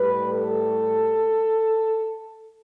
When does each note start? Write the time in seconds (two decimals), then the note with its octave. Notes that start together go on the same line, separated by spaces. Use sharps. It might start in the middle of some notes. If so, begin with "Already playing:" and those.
Already playing: A2 G3 B4
0.32 A4